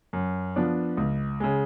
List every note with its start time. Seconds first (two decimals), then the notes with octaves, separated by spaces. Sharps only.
0.13 F#2
0.56 F3 B3 D4
0.97 C#2
1.40 C#3 G#3